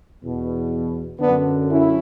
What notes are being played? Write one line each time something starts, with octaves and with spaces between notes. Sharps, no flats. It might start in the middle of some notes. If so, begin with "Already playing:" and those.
E2 B2
F#2 D3 B3 D4
C#4 E4